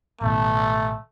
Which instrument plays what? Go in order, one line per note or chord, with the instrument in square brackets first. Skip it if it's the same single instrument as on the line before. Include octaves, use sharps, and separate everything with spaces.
[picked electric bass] A1 B2 D#3 [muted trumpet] A3